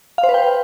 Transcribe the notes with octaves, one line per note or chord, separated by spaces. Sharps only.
F5
C5
B4
G5